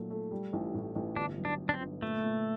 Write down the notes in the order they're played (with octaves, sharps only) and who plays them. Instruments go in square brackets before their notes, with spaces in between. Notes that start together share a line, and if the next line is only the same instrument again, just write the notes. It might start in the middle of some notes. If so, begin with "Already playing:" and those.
Already playing: [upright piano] A#2 F#3 A3
A3
G3
A1
A2
A1
[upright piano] G1 [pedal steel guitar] D4
[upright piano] F#3
[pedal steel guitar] D4
[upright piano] G1
[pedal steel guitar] D4
C4
[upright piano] G1
[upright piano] A#2 [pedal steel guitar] A3
[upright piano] A#2